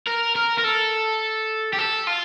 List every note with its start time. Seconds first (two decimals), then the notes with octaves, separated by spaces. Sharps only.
0.07 A#4
0.35 A#4
0.58 A#4
0.64 A4
1.73 G4
1.78 A4
2.07 F4